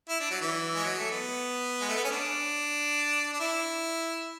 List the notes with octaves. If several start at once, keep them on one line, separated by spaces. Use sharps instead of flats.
E4
D4
F#3
E3
G#3
F#3
A3
B3
G#3
A3
B3
C#4
D4
D4
E4